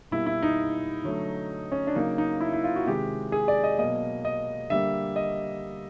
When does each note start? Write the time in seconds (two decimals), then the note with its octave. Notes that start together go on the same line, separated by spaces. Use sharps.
0.11 B2 G3 A#3 E4
0.26 E4
0.43 D#4
1.04 D3 F#3 A3
1.72 C#4
1.87 D4
1.95 C#3 F#3 A#3 D#4
2.18 D#4
2.40 E4
2.53 E4
2.64 F4
2.76 F#4
2.86 C3 D#3 G#3 G4
3.32 G#4
3.48 D5
3.64 D#5
3.78 B2 F#3 A#3 D#5
4.25 D#5
4.70 D3 G3 A#3 E5
5.16 D#5